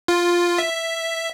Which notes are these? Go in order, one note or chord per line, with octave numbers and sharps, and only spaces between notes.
F4
E5